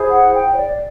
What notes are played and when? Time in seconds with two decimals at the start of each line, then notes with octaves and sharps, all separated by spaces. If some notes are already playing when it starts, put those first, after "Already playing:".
Already playing: E4 G#4 C5
0.10 F#5
0.34 G5
0.52 C#5
0.58 D5